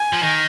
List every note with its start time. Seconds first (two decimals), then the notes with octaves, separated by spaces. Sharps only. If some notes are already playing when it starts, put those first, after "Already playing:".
Already playing: G#5
0.13 F3
0.23 D#3